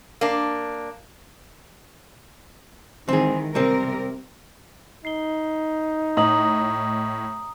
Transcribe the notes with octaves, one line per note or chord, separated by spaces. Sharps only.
A#3 D4
D#3 E3 G#3 C4 G#4
C3 G3 C4 A#4
D#4 C7 G7
A2 D#5 A#5 D#6 F#7